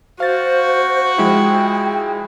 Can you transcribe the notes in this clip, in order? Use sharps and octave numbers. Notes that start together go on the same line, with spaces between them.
F#4 C5 F5 A6
F3 G#3 E4 G5